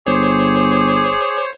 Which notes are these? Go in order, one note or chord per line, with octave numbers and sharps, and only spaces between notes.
G1 G#4 C5 C#5 D6